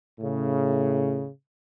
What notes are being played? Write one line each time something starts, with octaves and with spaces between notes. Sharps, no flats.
A2 C#3